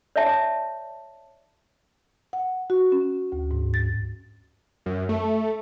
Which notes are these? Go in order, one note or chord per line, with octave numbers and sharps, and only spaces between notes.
C#5 D5 E5 A5
F#5
F#4
C#4
D2
G#2
A6
F#2
A3